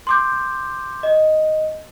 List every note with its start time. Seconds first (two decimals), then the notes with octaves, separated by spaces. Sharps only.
0.07 C6 D6 G6
1.03 D#5